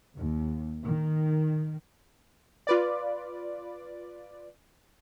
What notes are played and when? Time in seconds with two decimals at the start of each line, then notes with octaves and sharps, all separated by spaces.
0.16 D#2
0.84 D#3
2.67 F4 B4 D5